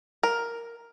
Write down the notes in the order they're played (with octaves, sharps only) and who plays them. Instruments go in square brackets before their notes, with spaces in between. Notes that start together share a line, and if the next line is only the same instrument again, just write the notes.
[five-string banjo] A#4